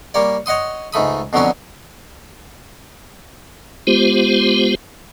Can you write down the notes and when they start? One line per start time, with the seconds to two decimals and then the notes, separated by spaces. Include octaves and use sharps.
0.14 G3 A#3 C#5 D5
0.46 C#5 D#5 F#5 C6 D#6
0.93 C#2 G#2 A3 B5 D#6
1.33 F2 B2 D3 F#3 C#4 D5
3.87 G#3 B3 F4 G4 C5